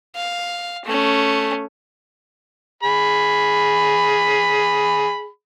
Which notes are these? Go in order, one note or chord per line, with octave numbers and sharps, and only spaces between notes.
F5
A3 C#4
G#4 B5